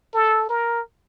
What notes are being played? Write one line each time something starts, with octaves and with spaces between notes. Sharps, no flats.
A4
A#4